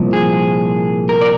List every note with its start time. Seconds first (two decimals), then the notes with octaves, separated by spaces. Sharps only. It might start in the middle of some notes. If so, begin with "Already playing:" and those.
Already playing: C2 A#2 F3
0.13 G#4
1.09 A#4
1.21 D5